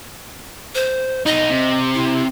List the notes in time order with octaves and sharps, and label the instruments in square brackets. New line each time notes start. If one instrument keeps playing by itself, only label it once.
[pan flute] C5
[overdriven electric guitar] B1 D#4 [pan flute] D#5
[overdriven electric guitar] C3
[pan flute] E4